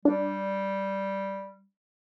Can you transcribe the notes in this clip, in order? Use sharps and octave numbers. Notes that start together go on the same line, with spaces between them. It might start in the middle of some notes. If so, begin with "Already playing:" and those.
G3 D4